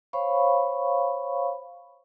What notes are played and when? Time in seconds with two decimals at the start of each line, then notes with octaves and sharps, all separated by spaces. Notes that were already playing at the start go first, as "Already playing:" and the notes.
0.13 C5 C#5 F5 B5 C#6